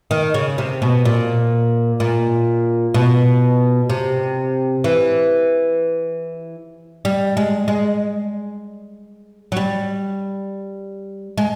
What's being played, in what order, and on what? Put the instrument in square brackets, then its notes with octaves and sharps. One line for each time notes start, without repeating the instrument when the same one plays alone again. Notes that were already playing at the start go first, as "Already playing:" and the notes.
[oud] D#3
C#3
C3
B2
A#2
A#2
B2
C3
E3
G3
G#3
G#3
F#3
G3
G#3